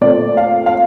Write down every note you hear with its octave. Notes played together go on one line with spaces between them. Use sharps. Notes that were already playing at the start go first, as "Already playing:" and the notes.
A#2 A3 C4 D5
F5
F5